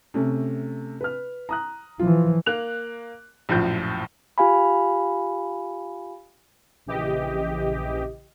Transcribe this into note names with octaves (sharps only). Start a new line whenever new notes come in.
C3 A3 C#4
B4 F6
A#5 D#6 F#6
E3 F3 F4
A#3 F#6 F7
A#1 F#2 A2 F3 G6
F4 G4 F5 G#5 B5
A#1 C#3 E3 G4 D#5